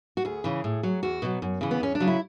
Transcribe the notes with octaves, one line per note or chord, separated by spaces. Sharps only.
F#4
D2 G#4
C#3 E3
A2
F#3
E2 F#4
B2 F#3
F#2
C#3 E3
B3
E2 C#4
D4
C#3 F#3
E4